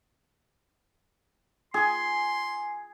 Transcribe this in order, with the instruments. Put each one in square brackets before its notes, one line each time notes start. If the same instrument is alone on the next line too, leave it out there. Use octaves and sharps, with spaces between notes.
[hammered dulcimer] G#4 [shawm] C6